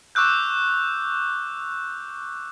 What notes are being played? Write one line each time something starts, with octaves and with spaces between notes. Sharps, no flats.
C#6 D6 E6 F#6 G6